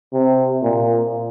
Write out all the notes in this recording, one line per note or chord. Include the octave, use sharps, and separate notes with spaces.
C3
A#2